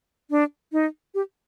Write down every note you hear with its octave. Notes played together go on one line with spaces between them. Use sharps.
D4
D#4
G4